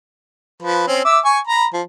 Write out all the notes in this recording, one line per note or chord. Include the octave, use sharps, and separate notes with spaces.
F3 B4
C4 C#4
E5 D6 E6
G#5 C#6
A#5 B5
F3